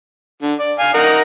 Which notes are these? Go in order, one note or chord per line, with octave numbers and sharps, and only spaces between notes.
D3
D5
F5 G#5
D#4 A#4 F#5